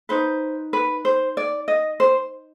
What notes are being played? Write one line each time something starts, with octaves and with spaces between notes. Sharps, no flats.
D#4 B4 C5
B4
C5
D5
D#5
C5